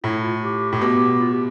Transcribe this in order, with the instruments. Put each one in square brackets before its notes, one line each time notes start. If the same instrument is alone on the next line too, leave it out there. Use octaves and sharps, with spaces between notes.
[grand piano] A2 [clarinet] E4
[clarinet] F4
G4
[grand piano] A2
[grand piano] B2 [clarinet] G4
[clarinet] F4
G4